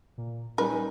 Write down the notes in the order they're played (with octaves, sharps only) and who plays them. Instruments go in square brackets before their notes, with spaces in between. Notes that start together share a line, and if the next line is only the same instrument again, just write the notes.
[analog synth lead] A#2
[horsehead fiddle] G3 D#4 [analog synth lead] C#4 [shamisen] A#4 B4